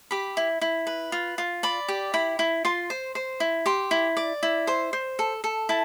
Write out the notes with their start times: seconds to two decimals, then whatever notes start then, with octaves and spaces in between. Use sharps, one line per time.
0.11 G4 B5
0.37 E4
0.61 E4
0.87 B4
1.12 F4
1.38 F4
1.63 D5 B5
1.88 G4
2.14 E4 B5
2.39 E4
2.65 F4 C6
2.90 C5
3.15 C5
3.40 E4
3.66 G4 C6
3.91 E4
4.17 D5
4.43 E4
4.67 C5 C6
4.93 C5
5.19 A4
5.44 A4
5.69 E4 A5